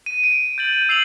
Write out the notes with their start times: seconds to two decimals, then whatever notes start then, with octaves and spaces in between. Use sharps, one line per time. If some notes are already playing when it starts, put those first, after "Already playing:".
0.06 D#7
0.24 D7
0.58 G6 A6 F#7
0.89 E6 C7 F7 F#7